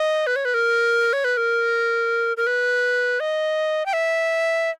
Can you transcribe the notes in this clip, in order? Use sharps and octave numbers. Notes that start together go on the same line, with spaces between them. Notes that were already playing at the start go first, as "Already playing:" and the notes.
Already playing: D#5
B4
C#5
B4
A#4
C#5
B4
A#4
A#4
B4
D#5
G5
E5